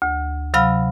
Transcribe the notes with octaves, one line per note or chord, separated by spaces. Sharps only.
D2
C3 F#3 F5 B5 F6 A#6